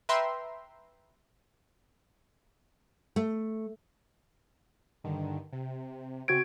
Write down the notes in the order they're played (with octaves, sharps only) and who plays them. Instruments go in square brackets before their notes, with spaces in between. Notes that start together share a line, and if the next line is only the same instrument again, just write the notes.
[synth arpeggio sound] B4 E5 G5 A#5 C6
[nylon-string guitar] A3
[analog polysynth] G2 D3 D#3
C3
[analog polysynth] C#3 C4 [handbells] F#4 G#6 D7